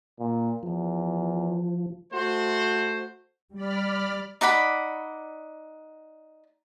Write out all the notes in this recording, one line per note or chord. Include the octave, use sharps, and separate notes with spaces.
A#2
E2 F3
A3 F#4 C5
G3 D5 B5 F6
D#4 D5 F#5 B5